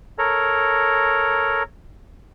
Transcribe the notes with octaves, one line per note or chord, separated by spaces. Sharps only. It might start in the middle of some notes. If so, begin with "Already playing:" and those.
A4 A#4 C#5 A#5